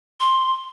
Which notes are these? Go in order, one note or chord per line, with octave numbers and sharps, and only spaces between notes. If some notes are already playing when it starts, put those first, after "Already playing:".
C6